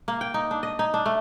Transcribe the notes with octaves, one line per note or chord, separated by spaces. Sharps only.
A#3
G5
D#4
D4
D#5
D#4
D4
A3